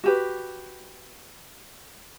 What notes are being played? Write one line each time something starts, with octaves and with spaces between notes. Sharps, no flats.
F#4 G4 B4